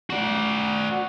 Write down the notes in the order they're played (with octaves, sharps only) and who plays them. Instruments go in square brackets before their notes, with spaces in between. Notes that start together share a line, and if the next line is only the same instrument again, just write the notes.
[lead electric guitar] F#4 D5